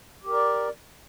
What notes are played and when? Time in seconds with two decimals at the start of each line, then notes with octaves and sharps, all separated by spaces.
0.23 G4
0.28 A#4
0.33 D5